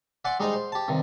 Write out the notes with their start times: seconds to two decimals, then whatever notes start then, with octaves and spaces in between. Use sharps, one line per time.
0.25 D5 E5 F#5 G#5 C6 D6
0.40 G3 G#3 D#4 C5 D#5 A#5
0.53 C5
0.72 G4 A5
0.88 G2 C3 D#3